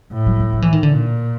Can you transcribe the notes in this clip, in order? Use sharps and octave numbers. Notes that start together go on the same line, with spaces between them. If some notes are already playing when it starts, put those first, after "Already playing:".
A2
F#3
F#3
F3
E3
D#3
D3
A#2